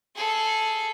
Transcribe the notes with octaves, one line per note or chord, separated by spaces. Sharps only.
G#4 A4